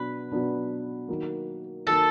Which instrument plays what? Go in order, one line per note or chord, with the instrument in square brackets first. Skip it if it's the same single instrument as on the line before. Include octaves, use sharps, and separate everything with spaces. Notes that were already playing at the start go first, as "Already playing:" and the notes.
Already playing: [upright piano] B2 F#3 B3 D4 [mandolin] B4
[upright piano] B2 F#3 B3 D4
D#3 F#3 A#3
[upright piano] D#3 F#3 A#3 [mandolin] A4